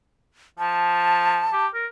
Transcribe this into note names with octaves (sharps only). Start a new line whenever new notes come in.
F3 A5
G4
A#4